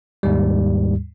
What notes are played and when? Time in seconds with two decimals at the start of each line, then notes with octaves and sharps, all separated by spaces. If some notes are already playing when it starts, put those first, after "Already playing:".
0.23 D#2 G#2 G3